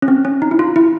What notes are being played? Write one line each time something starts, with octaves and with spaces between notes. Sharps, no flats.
C#4
C4
C#4
D#4
E4
F4
E4